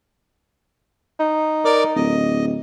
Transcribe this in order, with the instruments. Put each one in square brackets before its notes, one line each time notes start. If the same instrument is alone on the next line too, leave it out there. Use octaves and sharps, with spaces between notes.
[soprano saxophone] D#4
[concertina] A#4 D5 D6
[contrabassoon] D1 [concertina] D#5